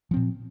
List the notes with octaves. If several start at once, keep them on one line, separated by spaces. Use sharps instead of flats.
A#2 F3 C4